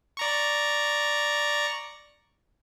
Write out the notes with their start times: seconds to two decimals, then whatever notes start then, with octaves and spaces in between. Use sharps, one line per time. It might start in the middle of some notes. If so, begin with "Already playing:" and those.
0.17 D5 A#5 C#6